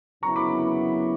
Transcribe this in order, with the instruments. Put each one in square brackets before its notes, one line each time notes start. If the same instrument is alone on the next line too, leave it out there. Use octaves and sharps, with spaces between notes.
[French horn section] F#2 C#3 F#3 B3 E4 [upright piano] A#5 C#6
[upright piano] B5 D6